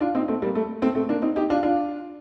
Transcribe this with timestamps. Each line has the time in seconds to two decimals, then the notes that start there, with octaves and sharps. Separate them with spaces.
0.01 D4 F4
0.15 C4 D#4
0.28 A3 C4
0.42 G3 A#3
0.55 A3
0.82 A3 C4
0.95 A3 C4
1.09 A#3 D4
1.22 C4 D#4
1.36 D#4 G4
1.50 D4 F4
1.63 D4 F4